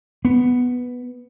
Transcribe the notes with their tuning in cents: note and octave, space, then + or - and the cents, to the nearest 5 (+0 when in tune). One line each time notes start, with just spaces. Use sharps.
B3 +0